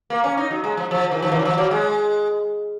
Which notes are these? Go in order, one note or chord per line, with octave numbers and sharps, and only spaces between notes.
A#3
C#4
D#4
F#3
G#3
F3
F3
D#3
F3
D#3
F#3
F3
F#3
G#3